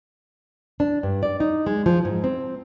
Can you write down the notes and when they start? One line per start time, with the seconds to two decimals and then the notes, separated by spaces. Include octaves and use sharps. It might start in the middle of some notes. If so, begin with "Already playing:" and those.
0.80 D4
1.03 G2
1.23 D5
1.40 D#4
1.67 G#3
1.86 F3
2.05 G#2
2.24 C4